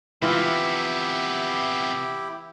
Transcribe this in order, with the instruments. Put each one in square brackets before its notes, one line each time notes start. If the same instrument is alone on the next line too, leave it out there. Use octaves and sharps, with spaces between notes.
[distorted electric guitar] C3 B3 [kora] E3 F4 [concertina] E4 G4